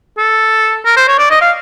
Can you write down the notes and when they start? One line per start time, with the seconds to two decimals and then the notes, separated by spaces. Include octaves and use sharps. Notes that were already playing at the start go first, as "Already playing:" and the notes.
0.18 A4
0.85 A#4
0.97 C5
1.08 C#5
1.18 D5
1.31 D#5
1.41 F5